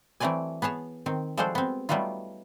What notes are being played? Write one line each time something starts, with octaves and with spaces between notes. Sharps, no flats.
E3 F#3 A3 C4 D5 G#5
B3 G#4 C#5 A5
D#3 C4
F3 G3 G#3 F#4 A4 C5
B3 C4
F#3 G3 A3 B3 D#4 F4